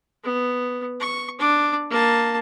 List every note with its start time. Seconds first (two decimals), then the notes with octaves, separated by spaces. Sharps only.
0.24 B3
1.00 C#6
1.39 D4 D6
1.91 A#3 A5